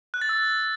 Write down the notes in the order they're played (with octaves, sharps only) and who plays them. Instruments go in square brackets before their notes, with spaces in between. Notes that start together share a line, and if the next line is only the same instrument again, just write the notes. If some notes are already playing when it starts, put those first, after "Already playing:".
[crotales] F#6
A6
E6